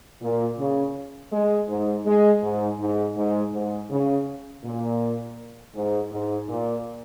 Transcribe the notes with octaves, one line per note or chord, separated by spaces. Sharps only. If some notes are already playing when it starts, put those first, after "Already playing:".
A#2
C#3
G#3
G#2
G#3
G#2
G#2
G#2
G#2
C#3
A#2
G#2
G#2
A#2